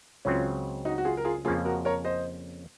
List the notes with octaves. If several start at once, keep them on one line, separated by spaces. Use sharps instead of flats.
C#2 C#3 F#3 C4 C#4 F4
D#4 F#4
F#4
F4 G#4
A#4
F4 G#4
F2 C#3 F3 A#3 C#4 F4 G#4
F#4 A#4
A#4 C#5
C5 D#5